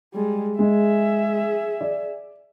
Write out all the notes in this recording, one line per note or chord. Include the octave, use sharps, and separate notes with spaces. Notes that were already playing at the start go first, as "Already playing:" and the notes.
G3 G#3
G#3 G#4 E5
D5